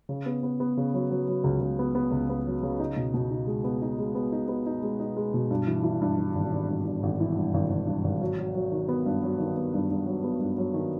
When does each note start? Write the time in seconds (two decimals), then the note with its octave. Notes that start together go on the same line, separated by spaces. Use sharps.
0.09 C#3
0.26 B3
0.43 B3
0.60 B3
0.77 C#3
0.94 F#3
1.10 F#3
1.28 F#3
1.44 C#2
1.61 C#2
1.79 B3
1.95 B3
2.12 C#2
2.29 B3
2.46 F#3
2.63 C#3
2.80 D#4
2.96 B2
3.14 B2
3.31 D#4
3.47 G#3
3.64 B3
3.82 D#4
3.99 G#3
4.15 B3
4.32 D#4
4.48 B3
4.66 D#4
4.83 G#3
4.99 D#4
5.17 G#3
5.34 B2
5.51 G2
5.67 E3
5.84 E3
6.01 G2
6.18 E3
6.35 G#1
6.52 G#1
6.69 G2
6.85 G2
7.03 G#1
7.20 E3
7.37 G2
7.54 G#1
7.70 G#1
7.87 G2
8.04 G#1
8.21 F#3
8.38 F#3
8.55 F#3
8.72 D#3
8.88 B3
9.06 G2
9.23 F#3
9.39 D#3
9.57 B3
9.74 G2
9.91 G2
10.06 F#3
10.24 B3
10.41 G2
10.58 F#3
10.74 D#3